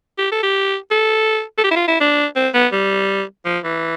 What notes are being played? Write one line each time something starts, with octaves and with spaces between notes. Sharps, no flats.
G4
A4
G4
A4
A4
G4
E4
F4
E4
D4
C4
B3
G3
F3
E3